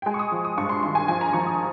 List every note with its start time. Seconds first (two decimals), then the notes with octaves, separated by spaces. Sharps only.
0.02 G5
0.06 G#3 G#5
0.14 C#6
0.19 D#6
0.32 F3
0.45 D#6
0.58 G2 C#6
0.69 C6
0.83 G#1 C6
0.95 G#5
1.08 F3 G#5
1.21 A#5
1.33 F3 C#6
1.47 D#6